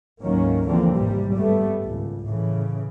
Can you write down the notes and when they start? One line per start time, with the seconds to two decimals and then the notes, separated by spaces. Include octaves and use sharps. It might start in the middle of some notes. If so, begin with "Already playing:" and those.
0.23 D2 G#2 D#3 F#3 A#3 C#4
0.66 D3 E3 F3 A#3 C4
0.96 G#1 C3 G3
1.36 G2 G3 A3 B3
1.83 G#1 C#2
2.25 A2 C#3 E3